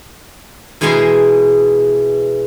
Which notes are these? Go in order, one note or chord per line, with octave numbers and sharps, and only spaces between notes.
B2 E3 G#3 G#5 A#5 C6